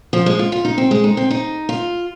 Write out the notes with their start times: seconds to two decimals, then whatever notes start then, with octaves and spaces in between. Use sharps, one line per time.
0.13 F3
0.26 G#3
0.39 F4
0.52 F4
0.65 D#4
0.78 C4
0.91 G#3
1.04 D#4
1.17 C4
1.30 D#4
1.69 F4